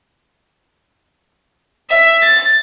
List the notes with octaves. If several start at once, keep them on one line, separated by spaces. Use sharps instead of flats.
E5
A6